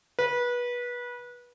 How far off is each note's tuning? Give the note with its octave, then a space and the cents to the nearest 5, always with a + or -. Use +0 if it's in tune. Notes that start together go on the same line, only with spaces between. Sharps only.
B4 -25